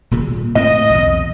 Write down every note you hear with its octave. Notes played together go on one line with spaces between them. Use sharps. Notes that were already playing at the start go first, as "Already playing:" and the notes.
D#1 A#2 C#3
A2 C4 D#5
B1 E2